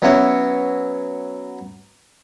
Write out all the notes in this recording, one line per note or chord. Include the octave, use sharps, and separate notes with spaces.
F#3 B3 C#4 E4 F#4